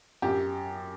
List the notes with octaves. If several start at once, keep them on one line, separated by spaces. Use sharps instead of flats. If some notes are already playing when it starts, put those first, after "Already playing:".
F#2 G4